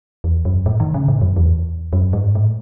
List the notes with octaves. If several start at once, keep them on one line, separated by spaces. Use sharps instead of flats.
E2
F#2
A2
D#3
C#3
A2
F#2
E2
F#2
G#2
A2